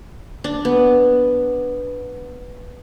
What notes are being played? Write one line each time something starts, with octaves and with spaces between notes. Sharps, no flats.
D4
B3